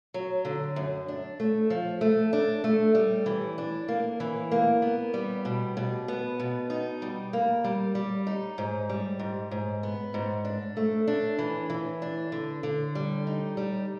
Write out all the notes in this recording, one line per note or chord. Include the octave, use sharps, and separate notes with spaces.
F#3
D3
F#2
D4
A3
F3
A3
D4
A3
G3
E3
D4
A#3
E3
A#3
B3
G3
B2
B2
B3
B2
D#4
G3
A#3
G3
G3
D#4
G#2
G3
G#2
G#2
B3
G#2
D4
A3
D4
E3
E3
D4
D3
D3
G3
D#4
G3